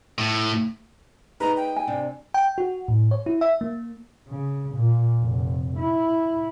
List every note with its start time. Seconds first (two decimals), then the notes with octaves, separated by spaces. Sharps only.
0.18 A2
1.40 D#4 G#4 B4 D#5 A#5
1.57 G5
1.76 G#5
1.87 C3 D4
2.34 G5
2.58 F#4
2.88 A2
3.11 C#5
3.26 E4
3.41 E5
3.61 A#3
4.28 C#3
4.76 A#2
5.19 F1
5.77 E4